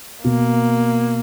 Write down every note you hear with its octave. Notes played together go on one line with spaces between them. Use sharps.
B2 A#3